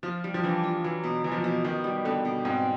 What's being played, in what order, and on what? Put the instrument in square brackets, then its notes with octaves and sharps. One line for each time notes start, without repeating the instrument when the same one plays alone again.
[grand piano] F3 [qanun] F4
[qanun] G3
[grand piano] F3
[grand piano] E3 [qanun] D4
[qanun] F4
[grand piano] E3 [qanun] F#3
[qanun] B2
[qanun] B2 [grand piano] E3
[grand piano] F3
E3
[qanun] B2
[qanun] B2 [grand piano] D#3
[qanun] G3
[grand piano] D3 [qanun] B3
[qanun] B2
[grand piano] G#2 [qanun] C4